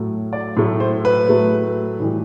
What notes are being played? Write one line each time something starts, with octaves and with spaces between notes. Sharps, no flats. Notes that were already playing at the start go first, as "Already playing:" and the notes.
Already playing: A2 F#3 A3
D5
A2 F#3 A3
C5
B4
A2 F#3 A3
A2 E3 G3